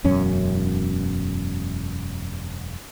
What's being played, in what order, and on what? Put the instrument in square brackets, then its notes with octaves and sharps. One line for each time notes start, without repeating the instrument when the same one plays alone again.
[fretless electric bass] E1 F#2 C#4